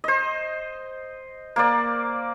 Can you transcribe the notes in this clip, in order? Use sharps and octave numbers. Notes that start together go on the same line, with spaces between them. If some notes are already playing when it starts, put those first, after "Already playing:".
C5 D#5
A#3 C5 D5